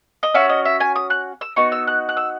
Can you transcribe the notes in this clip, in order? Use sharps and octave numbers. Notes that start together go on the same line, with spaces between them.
D#5
C#4 F#4 E5
D#5
E5
G#5
D#6
F#6
E6
B3 D#4 F#4 C#6
E6
F#6
F#6
E6